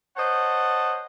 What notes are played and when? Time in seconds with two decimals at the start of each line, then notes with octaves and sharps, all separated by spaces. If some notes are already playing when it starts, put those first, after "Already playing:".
0.17 C5 C#5 D#5 F#5 A5